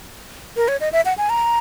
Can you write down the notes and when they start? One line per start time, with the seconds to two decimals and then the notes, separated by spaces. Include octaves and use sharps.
0.57 A#4
0.68 C#5
0.81 D#5
0.93 E5
1.05 F#5
1.18 G#5
1.29 A#5